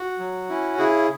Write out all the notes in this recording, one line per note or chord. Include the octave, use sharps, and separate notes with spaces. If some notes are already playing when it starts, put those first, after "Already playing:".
Already playing: F#4
F#3
C#4 E4
C#3 E4 G#4